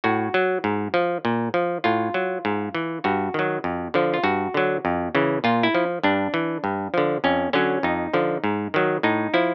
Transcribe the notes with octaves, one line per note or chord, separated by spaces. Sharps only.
A2 F#4
F#3
G#2
F3
A#2
F3
A2 F4
F#3
G#2
E3
G2 F#4
D#3 F#3
F2
D3 F3
F4
G2 F#4
D3 F#3
F2
C#3 E3
A#2 F4
E4
F3
G2 D4
E3
G2
D3 F3
F2 C#4
D3 F#3 C#4
F2 D#4
D3 F3
G#2
D#3 F#3
A2 D#4
F3 E4